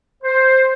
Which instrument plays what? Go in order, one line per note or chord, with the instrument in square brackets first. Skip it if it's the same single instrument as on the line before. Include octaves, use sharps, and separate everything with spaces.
[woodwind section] C5